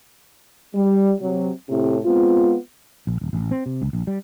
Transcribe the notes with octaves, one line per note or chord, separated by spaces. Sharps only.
G3
C3 F#3
A2 C3
G#3 B3 C4 F4
A#1
D#1
A1
C4
C3
C#2
A#1
G3